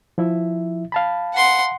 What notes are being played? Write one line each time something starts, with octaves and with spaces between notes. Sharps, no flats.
F3 E4 E5
F5 A5 B5
F#5 C6